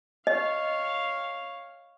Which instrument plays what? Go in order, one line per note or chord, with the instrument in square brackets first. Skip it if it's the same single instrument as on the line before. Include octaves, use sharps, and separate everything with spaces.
[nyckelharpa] C#5 F5 [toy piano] D#5